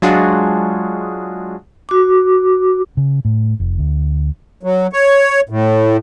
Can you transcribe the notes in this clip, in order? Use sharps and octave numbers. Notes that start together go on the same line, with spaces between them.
F#3 G#3 D4 F4 F#4 G#4
F#4 D6
C#3
A2
F1
D2
F#3
C#5
A2